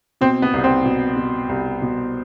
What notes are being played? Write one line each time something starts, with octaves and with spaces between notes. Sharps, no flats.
B2 C4
B3
C2
C4
B2
B2
C2
B2